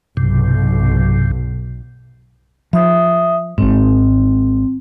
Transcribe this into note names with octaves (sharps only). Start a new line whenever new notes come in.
B1 G2 C3
F3 E5 D#6
G#1 G#2 C4